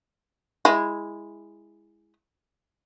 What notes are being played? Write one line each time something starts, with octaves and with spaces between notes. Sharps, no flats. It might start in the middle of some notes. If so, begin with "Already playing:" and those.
G#3 E4